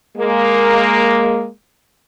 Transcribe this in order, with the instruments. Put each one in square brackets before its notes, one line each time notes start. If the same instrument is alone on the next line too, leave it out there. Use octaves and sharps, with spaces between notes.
[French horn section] G#3 A#3